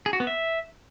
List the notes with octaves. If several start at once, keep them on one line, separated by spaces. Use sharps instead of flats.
G#4
F#4
B3
E5